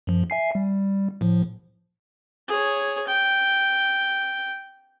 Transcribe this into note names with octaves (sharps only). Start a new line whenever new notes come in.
F#2 F3
E5 G#5 C7
G3
A2 F3
G#4 C#5
G5